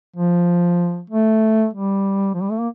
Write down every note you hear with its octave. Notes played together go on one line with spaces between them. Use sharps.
F3
A3
G3
F3
G3
A3
A#3